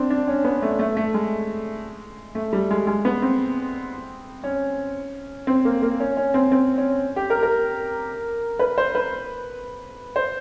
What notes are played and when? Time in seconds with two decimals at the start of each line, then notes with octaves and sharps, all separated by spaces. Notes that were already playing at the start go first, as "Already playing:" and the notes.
Already playing: C4 D4
0.10 D4
0.28 C#4
0.44 B3
0.62 A3
0.79 A3
0.97 A3
1.14 G#3
2.35 A3
2.53 G3
2.71 G#3
2.87 G#3
3.05 B3
3.22 C4
4.44 C#4
5.47 C4
5.65 A#3
5.82 A#3
6.00 C#4
6.17 C#4
6.34 C4
6.52 C4
6.78 C#4
7.16 G4
7.30 A#4
7.43 A#4
8.59 B4
8.78 C5
8.95 B4
10.16 C5